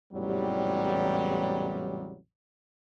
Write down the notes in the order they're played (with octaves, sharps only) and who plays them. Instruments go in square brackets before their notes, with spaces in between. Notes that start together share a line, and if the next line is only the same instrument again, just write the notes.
[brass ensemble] A1 E2 G#2 C3 F#3 G3